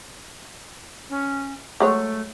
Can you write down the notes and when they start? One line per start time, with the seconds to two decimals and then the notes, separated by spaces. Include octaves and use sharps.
1.10 C#4
1.80 F#3 G#3 A3 C#5